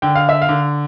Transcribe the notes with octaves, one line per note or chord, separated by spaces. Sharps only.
D3 G5
F5
E5
F5
D3